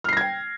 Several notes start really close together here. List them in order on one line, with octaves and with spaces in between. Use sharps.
F6 C7 A#6 G#6 G5